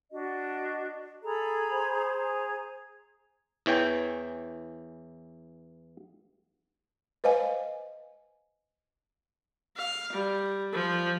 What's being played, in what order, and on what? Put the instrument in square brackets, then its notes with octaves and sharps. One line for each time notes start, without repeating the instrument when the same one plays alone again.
[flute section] D4 F#4 [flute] D#5
[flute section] G#4 A#5 B5 [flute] A4
[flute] C5
[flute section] G#4 A#5
[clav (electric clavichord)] E2 E3 C#5 G5 G#5
[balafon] B4 C5 D#5 F5 G#5
[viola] F5
G3
F3